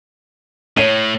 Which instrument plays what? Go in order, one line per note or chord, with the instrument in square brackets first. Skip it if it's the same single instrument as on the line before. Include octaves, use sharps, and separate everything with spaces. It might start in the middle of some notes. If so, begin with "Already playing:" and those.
[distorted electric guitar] A2 [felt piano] C#5 D#7